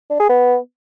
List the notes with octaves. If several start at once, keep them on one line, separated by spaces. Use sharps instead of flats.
D4
G#4
B3